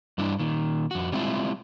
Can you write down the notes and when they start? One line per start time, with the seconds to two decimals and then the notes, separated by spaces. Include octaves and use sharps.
0.18 G2 G3 D4 E4
0.39 A#2 D#3
0.91 F2 F#4
1.12 G3 G#3 C4 E4 F4